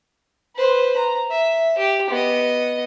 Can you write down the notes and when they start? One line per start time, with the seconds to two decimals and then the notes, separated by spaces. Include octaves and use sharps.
0.56 B4 C5
0.97 A#5
1.31 E5
1.78 G4
2.10 B3 D#5